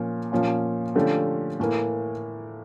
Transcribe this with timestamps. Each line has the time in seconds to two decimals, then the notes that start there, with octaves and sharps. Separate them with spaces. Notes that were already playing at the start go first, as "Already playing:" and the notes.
Already playing: A#2 F3 C#4
0.32 A#2 F3 C#4 F4
0.95 D3 F3 A3 C#4 G4
1.60 A2 E3 A#3